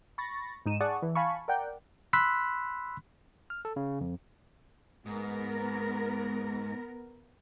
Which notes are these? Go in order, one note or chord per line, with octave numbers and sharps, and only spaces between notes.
B5 C#6 A6 A#6
G#2 D#4 D#7 E7
G#4 D5 F#5 A5 C#6 D#6
E3
F5 G#5 A5 B5 C#6
A#4 D5 F#5 G5
B5 C6 E6 F#6 B6
F6
A4
C#3
F2
G#2 B3 A#4